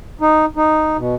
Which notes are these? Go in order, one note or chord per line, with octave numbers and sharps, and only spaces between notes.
D#4
D#4
B2